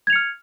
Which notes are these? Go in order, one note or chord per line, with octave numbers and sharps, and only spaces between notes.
F6 G#6 C#7 F7